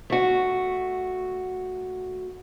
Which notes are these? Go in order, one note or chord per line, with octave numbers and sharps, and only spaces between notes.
A3 F#4